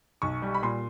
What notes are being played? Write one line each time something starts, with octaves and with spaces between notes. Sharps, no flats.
B1 C#6
G3
B5
A#2 C6